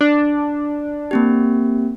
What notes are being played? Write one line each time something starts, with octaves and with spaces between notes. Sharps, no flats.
D4
A#3 C4 G4